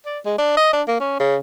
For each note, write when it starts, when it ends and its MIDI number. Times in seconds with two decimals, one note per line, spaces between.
0.06 0.19 74
0.25 0.35 56
0.38 0.55 62
0.57 0.70 75
0.73 0.82 62
0.88 1.00 58
1.00 1.15 61
1.20 1.37 49